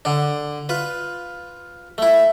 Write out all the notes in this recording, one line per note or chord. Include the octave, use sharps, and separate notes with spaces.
D3 D4
F4 B4
A3 E4